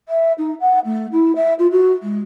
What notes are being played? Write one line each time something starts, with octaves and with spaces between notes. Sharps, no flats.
E5
D#4
F#5
A3
E4
E5
F4
F#4
G#3